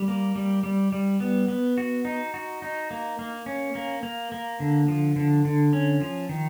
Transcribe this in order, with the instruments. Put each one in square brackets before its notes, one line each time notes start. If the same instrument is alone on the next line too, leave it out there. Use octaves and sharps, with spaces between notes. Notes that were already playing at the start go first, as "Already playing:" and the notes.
Already playing: [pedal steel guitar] G3
A#3
G3
G3
G3
B3
B3
F#4
D#4
F#4
D#4
A#3
A#3
C#4
A#3
A#3
A#3
D3
F3
D3
D3
C#4
F3
D#3